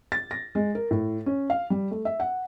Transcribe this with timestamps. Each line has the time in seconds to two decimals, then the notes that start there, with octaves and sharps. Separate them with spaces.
0.12 A6
0.31 A#6
0.55 G#3
0.75 A#4
0.91 A2
1.26 C#4
1.50 F5
1.70 G3
1.91 A3
2.05 E5
2.20 F#5